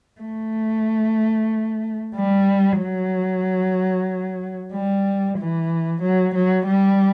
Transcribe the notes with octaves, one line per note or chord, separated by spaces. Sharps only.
A3
G3
F#3
G3
E3
F#3
F#3
G3